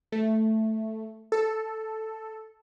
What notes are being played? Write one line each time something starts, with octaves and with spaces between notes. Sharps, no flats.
A3
A4